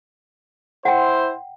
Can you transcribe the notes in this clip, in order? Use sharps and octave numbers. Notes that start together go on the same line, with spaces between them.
E4 C5 F#5 G5